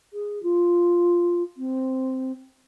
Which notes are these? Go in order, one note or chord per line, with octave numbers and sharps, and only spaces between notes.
G#4
F4
C4